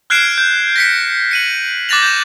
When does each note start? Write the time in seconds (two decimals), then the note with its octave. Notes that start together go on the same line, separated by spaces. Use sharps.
0.10 F6 F#6 G#6 C7 D7 E7
0.38 G6
0.76 A#6 B6 C#7
1.31 C#7 D#7 F#7
1.89 D6 F#6 A6 A#6 F7 F#7
2.02 G6 E7